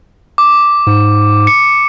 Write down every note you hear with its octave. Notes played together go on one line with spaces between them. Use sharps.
D6
G#2
C#7